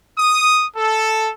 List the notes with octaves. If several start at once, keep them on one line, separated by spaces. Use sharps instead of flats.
D#6
A4